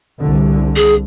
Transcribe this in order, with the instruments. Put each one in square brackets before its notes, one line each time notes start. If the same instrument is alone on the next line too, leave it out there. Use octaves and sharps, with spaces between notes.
[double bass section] C2 D3
[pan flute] G#4